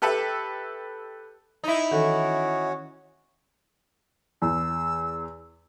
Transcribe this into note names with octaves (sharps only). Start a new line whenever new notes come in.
G4 A4 B4 E5 B5
D#4 E4
D#3 E3 C#4 F#4 A4
E2 E6